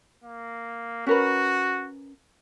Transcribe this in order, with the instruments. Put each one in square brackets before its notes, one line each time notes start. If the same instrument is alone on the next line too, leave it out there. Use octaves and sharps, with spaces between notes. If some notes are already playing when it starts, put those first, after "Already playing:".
[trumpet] A#3
[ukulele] C#4 A#4 B4 [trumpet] F#4